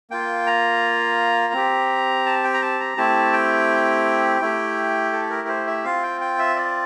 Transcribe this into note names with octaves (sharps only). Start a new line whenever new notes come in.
A#3 F4 G5
A#5
C4 G4
A5
G5
A#5
A5
A#5
A3 C4 E4 G4 A5
G5
A3 E4 G4
A4
A#4
C5
E5
C4 F4 F5
G5
G5
E5
D5